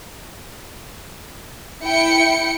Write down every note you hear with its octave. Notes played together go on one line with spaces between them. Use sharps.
E4 G5 C#7